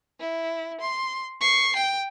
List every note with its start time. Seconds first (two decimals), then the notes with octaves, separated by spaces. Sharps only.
0.20 E4
0.81 C6
1.41 C#6 C7
1.76 G5